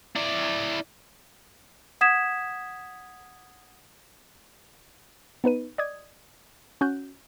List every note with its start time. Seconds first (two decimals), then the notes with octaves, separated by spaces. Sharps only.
0.16 E4 D5
2.01 F#5 D#6 G#6 B6 E7
5.44 B3 D#4 B4 D#7
5.78 D5 D#5 D#6 G#6
6.81 C#4 F#4 F#6 G6